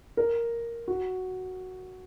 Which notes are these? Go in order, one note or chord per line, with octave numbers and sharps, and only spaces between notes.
A#4
F#4